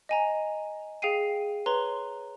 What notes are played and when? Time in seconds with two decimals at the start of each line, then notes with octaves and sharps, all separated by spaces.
0.09 D#5 G#5 A#5
1.02 G#4 F5 G5 C7 D#7
1.66 B4 C#5 A#5 C6 G7